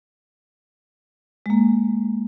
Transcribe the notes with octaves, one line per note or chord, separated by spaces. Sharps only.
G#3 A#3